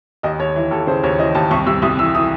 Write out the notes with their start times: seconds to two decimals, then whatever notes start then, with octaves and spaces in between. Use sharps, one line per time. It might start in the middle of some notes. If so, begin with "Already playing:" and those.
0.23 D#2 D#5
0.39 D#2 C#5
0.56 E3
0.71 D#2 A4
0.87 C#3 C5
1.03 D#2 C#5
1.18 E3 D#5
1.35 D#2 A5
1.51 C2 C#6
1.67 C2 E6
1.82 C2 D#6
1.99 E3 E6
2.14 E3 D#6